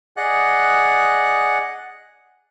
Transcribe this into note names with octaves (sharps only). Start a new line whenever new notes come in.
G#4 D5 D#5 F#5 F#6